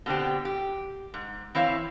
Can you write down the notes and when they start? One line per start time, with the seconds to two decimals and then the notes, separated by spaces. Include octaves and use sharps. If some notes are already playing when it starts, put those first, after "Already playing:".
0.06 B2 D3 C4 G4
0.45 G4
1.14 G#2
1.55 E3 C4 E4 C#5 F5